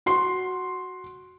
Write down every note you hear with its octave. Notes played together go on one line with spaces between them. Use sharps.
F#4 C6